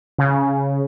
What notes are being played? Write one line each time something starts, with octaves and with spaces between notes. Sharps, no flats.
C#3